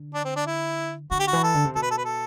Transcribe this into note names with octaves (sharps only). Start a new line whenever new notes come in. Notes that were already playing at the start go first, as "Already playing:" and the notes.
Already playing: D3
D4
C4
D4
E4
D3 F#4
G4
F#4
E3
A4
D3
C3
B2 A4
B4
A4
B4
A4